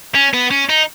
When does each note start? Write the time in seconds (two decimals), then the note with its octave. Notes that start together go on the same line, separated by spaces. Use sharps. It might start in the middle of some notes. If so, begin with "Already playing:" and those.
0.15 C#4
0.34 B3
0.51 C#4
0.69 D#4